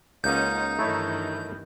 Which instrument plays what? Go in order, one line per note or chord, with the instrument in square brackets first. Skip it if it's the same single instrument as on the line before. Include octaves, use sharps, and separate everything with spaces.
[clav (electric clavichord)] C#2 A#3 D#5 [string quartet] C#4 F4 F#5 [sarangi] D#4 [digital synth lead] G6
[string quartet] G2 D#3 E3 [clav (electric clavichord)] A3 E4 C#5